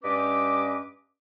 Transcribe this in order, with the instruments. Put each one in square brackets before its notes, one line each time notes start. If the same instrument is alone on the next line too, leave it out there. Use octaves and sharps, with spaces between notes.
[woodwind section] G2 C#4 B4 D#5 D6